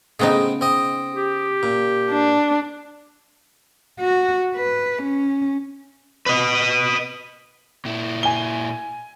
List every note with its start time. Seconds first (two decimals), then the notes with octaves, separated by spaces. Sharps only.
0.20 C#3 G#3 A3 B3 C4 D#4
0.61 C4 D#5
1.14 G4
1.63 A#2
2.10 D4
4.00 F#4
4.56 B4
5.02 C#4
6.26 B4 D#5
7.85 A#2 E4
8.23 G#5 G7